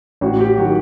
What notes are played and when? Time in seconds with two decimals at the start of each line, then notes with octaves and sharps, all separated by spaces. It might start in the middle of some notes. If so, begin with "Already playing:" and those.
0.21 A1 F#4
0.40 G4
0.58 D#3 F#3 F#4